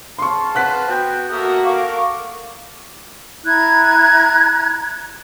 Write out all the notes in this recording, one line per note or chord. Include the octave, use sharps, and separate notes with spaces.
G#4 F5 A5 C6 C#6
B4 C5 F#5 F#6 B6
B3 F#4 G5
A#3 F#4 A4 A#4 E5 D#6
A4 A#4 F5 C#6 D6
E4 A#5 F#6 G#6